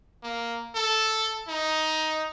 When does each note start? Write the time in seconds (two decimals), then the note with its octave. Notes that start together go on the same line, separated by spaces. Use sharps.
0.23 A#3
0.75 A4
1.48 D#4